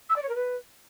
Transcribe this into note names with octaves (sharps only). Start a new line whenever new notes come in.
E6
D5
C#5
A#4
B4